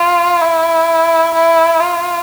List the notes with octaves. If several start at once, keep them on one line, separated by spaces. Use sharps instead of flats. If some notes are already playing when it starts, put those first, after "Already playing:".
Already playing: F4
E4
E4
F4